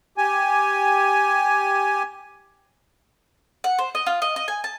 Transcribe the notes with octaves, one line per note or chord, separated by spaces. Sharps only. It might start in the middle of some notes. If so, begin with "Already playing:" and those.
G4 G#5
F#5
C5
D#5
F4
D#5
D#5
G#5
A5